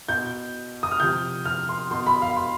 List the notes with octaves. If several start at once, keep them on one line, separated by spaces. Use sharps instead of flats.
B2 G6
D#6
F6
C3 F3 G6
F6
C6
B2 C6
B5
F5
C6